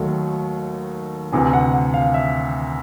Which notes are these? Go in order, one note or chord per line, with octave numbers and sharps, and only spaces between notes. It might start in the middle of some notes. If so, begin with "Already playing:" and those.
Already playing: D#2 D#3 F#3 A3
D2 C3 E3 G#5
F#5
F#5
F5
E5